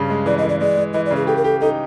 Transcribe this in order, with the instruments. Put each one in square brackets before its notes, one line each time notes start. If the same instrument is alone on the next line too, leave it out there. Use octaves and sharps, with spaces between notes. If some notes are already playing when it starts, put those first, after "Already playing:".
Already playing: [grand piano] G2 C#3
G#3
[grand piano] E3 [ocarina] D5
[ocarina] D#5
[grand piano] E3
[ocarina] D5
[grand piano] G#3 [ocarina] D5
[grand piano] G#3
[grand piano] E3 [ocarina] D#5
[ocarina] D5
[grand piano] C#3
[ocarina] G#4
[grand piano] G4 [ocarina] A4
[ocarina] A#4
[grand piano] G4 [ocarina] A4
[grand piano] D#4 [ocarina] A4